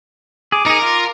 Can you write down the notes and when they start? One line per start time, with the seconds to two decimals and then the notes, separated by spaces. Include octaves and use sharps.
0.52 G#4 D6
0.66 D#4 G#4 A#4
0.82 F4